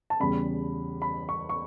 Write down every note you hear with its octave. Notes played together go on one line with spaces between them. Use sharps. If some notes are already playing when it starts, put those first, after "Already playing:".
A5
E2 C#3 G3 B5
B5
C#6
C#6